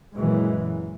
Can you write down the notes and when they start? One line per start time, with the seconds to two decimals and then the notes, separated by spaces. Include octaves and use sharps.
0.14 F#2 A#2 E3 F#3 G#3